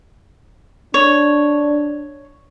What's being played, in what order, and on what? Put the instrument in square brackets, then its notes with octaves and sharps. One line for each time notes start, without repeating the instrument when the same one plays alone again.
[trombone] D4 [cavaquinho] C#5